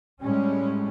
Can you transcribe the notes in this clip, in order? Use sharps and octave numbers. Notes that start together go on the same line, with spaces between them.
A2 G3 G#3 C#4